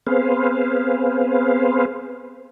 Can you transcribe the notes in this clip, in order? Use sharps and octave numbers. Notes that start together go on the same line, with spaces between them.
B3 C4 G#4 B4 C5 F5